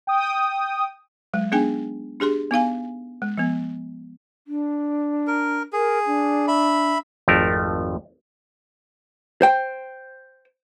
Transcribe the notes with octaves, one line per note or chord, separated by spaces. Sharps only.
G5 D#6
F#3 G#3
B3 D4 D#4 G#4 G5 G#5
D4 G4 G#4 C6
B3 D#4 F5 G#5
G#3
F3 B3
D4
A#4
G#4 A#4
D4
E5 B5
G#1 F2 F3 A3 A#4
C5 G5